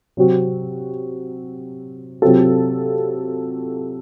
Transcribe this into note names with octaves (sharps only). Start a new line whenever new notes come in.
C3 F#3 C4 F#4
C3 F#3 C4 F4 A4